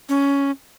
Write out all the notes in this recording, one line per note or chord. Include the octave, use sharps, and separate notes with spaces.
C#4